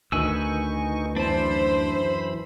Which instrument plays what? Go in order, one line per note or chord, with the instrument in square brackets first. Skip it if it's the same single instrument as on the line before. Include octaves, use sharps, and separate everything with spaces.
[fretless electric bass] D2 D#3 [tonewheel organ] D#4 C#6 [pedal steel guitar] B4 G#5 E6
[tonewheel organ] F#2 E3 B5 [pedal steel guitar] D4 A5 [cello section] C5